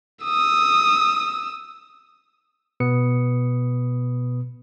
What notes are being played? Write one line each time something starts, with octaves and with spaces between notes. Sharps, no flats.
D#6 E6
B2 B3 B4 D#6 C#7